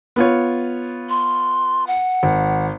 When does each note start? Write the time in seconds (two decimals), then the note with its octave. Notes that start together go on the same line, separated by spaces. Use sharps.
0.16 B3 F4 C#5
1.09 C6
1.87 F#5
2.23 G#1